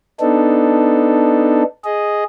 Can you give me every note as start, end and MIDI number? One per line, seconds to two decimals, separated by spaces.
0.20 1.63 59
0.20 1.63 62
0.20 1.63 63
0.20 1.63 69
1.85 2.24 68
1.85 2.24 75